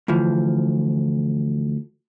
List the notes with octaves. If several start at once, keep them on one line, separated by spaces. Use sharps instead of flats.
D2 E3 F3